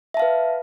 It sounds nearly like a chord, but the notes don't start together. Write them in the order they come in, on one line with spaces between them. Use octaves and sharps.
E5 A5 F5 B4